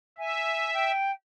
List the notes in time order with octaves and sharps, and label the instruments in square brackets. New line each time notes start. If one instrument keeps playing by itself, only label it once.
[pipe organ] E5 [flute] G#5
[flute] G5